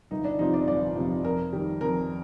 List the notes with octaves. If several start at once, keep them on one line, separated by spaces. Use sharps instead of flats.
G1 D#4
D4
F2 C3 F3 D#4
D5
G1 D5
F2 C3 F3
F2 A#4
D#3 G3
F2 A#4